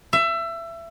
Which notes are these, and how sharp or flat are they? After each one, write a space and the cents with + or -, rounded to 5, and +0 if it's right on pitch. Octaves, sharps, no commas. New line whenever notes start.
E5 +25